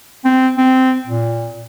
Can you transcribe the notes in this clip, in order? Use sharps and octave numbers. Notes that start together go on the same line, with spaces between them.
C4
C4
A#2